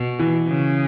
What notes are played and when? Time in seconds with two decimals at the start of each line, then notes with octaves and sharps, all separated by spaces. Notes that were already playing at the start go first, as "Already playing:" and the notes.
Already playing: B2
0.19 E3
0.47 C#3